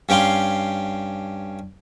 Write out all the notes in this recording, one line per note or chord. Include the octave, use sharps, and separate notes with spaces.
G2 C#4 G4 F5 C6